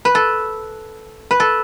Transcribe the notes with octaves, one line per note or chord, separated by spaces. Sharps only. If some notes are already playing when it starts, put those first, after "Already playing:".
B4
A4
B4
A4